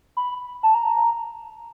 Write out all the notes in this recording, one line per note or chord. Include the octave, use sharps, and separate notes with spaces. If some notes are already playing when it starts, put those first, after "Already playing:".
B5
A5
A#5